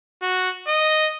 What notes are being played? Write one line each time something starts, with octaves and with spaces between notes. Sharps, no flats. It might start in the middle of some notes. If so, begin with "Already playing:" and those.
F#4
D#5